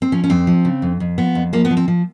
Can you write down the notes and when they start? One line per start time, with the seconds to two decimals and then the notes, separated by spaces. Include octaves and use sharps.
0.02 C4
0.12 F3 C#4
0.24 C#4
0.30 F2 C4
0.47 F3
0.65 C#3
0.82 F2
1.00 F2
1.18 F3 B3
1.35 F2
1.53 F3 A#3
1.65 B3
1.71 F3
1.77 C4
1.88 F3